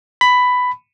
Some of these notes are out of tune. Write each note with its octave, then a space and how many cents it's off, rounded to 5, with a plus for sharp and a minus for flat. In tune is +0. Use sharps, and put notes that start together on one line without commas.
B5 +10